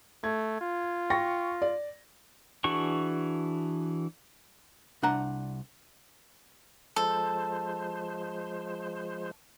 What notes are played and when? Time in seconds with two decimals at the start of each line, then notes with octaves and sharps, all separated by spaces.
0.24 A3 G#6
0.61 F4
1.10 G5 C#6 A#6
1.62 D5
2.64 E3 D4 F#4 G#4 C#6
5.03 C2 D4 F#5 A#5
6.96 F3 G#3 A4 C5